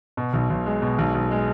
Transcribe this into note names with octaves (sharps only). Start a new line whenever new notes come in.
B2
B1
B1
G#3
B2
B1
B1
G#3